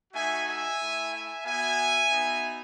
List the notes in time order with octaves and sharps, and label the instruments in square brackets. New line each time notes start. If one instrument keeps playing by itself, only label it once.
[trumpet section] A3 D#4 F#4 E5 G#5
E5 G#5
A3 E4
E5 G#5
B3 F#4 E5 G#5
B3 D#4 F#4